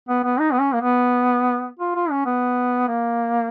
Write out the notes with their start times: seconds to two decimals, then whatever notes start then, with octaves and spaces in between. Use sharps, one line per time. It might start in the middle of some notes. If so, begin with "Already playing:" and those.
0.09 B3
0.24 B3
0.40 D#4
0.53 B3
0.60 C#4
0.74 A#3
0.81 B3
1.79 F4
1.96 F4
2.11 C#4
2.26 B3
2.88 A#3